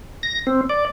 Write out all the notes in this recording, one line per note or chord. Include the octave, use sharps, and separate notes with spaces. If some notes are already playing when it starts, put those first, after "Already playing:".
A#6
C4
D5